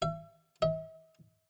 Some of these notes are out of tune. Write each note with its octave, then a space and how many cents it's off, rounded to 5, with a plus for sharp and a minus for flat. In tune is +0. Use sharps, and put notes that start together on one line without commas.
E5 +35
E5 -45